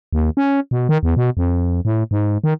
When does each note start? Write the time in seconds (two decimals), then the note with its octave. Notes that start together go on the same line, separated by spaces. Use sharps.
0.13 D#2
0.37 C#4
0.71 B2
0.89 D#3
1.03 E2
1.16 B2
1.37 F2
1.85 A2
2.11 G#2
2.44 D#3